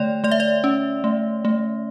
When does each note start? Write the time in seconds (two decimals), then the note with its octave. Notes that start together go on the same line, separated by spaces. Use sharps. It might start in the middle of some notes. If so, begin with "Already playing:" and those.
Already playing: D3 A3 C#5 D5 G5
0.24 A3 D5
0.31 E5
0.40 D5
0.64 C#4
1.04 A3
1.45 A3